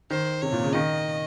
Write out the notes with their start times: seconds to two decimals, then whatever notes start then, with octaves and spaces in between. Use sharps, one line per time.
0.10 D#3 C5
0.42 C3 C#5
0.52 A#2
0.64 C#3
0.73 D#3 D#5